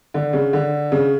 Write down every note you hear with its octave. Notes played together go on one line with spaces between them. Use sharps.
D3
C#3
D3
C#3